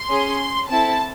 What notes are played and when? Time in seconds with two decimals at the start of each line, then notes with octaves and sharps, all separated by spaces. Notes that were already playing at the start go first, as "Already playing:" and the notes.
Already playing: C6
0.10 C#4 G#4
0.70 C4 E4 A4 A5